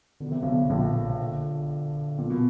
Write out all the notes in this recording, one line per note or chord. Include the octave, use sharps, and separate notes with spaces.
B2 D3
C3 D#3
D3
B1 B2
A#1 A#2
C#3
D3
A#2
B2